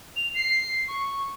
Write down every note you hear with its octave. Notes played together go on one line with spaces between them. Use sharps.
F7
C7
C#6